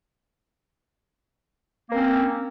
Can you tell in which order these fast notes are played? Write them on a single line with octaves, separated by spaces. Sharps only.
A#3 C4 C#4